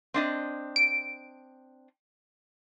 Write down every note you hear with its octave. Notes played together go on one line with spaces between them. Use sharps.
C4 D4 D#5
D7